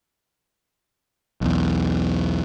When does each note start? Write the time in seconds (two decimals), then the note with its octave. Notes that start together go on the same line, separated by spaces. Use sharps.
1.41 B1 E2